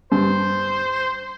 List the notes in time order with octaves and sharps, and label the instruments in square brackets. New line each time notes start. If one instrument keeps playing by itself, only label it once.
[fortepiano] G2 [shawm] C5